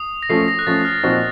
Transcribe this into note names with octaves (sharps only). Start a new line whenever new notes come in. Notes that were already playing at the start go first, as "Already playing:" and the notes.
Already playing: D#6
A#6
F3 A3 C#4 C7
A#6
F#6
F3 A3 C#4 A6
F6
A#2 F3 C4 D#4 F#4